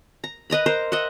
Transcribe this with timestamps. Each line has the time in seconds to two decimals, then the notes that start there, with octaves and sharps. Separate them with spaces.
0.24 A#5
0.50 B4 D#5 A#5 B5
0.66 A#4 C5 A#5
0.92 D#5 E5 F#5